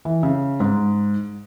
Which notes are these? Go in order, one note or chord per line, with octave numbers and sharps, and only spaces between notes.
E3
C#3
G#2